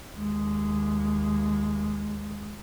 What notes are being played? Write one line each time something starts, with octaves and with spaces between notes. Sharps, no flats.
D#2 G#3